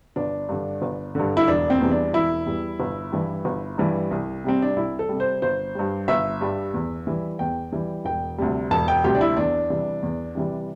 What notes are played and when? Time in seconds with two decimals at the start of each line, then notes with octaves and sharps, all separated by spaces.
0.16 G1 D4
0.49 G2 D3
0.82 G1
1.15 G2 D3
1.37 E4
1.48 E1 D4
1.70 C4
1.80 E2 E3 G3
1.92 D4
2.13 E1 E4
2.46 E2 E3 G3
2.80 G1
3.12 G2 E3 G3
3.45 G1
3.78 G2 E3 G3
4.11 C2
4.44 C3 G3 C4
4.62 D4
4.76 C2 E4
4.99 A4
5.09 C3 G3
5.20 C5
5.42 G1 C5
5.75 G2 G3
6.08 G1 E5
6.41 G2 G3
6.74 E2
7.07 E3 G3
7.39 E2 G5
7.72 E3 G3
8.05 E1 G5
8.38 D2 C3 G3
8.71 E1 A5
8.88 G5
9.04 D2 C3 G3 G4
9.15 D4
9.21 E4
9.37 E2 D4
9.70 C3 E3 G3
10.03 E2
10.35 C3 E3 G3